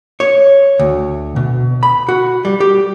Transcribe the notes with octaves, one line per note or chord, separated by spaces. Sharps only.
C#5
D2
B2
B5
F#4
G3
G4